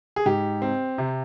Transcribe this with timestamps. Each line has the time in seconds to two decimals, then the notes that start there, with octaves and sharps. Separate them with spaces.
0.16 G#4
0.26 G#2 G4
0.62 C4
0.98 C3